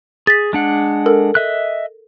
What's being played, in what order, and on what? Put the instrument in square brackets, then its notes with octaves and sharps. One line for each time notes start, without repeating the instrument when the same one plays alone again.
[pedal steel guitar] G#4 [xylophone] A6 B6
[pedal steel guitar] G#3 D4 F#5
[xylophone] A4 A#4
[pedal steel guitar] D#5 E5 F#6